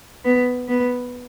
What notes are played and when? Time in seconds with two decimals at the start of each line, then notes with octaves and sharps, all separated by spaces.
0.24 B3
0.68 B3